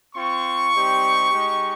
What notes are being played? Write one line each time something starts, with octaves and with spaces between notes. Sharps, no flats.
C4 F4 C#6
G3 C4 D#4 G4
G#3 D#4 G4